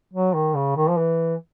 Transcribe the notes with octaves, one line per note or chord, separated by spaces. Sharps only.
F#3
D#3
C#3
D#3
F3
E3